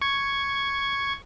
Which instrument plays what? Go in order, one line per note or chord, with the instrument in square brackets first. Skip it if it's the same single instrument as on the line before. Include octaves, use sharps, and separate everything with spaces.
[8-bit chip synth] C#6 G#6